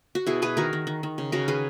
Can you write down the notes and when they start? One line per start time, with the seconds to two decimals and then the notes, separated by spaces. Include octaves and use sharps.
0.15 F#4
0.27 B2 E4 G#4
0.42 B2 G#4 B4
0.57 D#3 F#4 A#4
0.73 D#3
0.87 D#3
1.03 D#3
1.18 C#3
1.32 C#3 F#4 A#4
1.48 D#3 G#4 B4